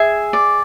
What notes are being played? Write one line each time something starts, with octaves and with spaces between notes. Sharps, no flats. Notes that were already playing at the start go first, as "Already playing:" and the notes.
Already playing: G#4 E5 G#5
D5